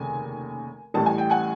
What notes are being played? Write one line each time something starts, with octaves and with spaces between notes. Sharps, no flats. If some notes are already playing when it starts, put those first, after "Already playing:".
Already playing: F1 D#2 C#3 G#5
A1 A2 E3 G3 A5
G#5
G5
F#5 G#5